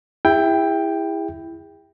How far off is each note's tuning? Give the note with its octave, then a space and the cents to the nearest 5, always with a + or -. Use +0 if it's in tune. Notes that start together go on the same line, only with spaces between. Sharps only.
E4 +0 G#4 -40 G5 +5